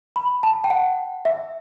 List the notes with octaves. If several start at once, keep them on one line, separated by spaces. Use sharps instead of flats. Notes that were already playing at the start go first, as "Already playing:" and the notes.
B5
A5
G5
F#5
E5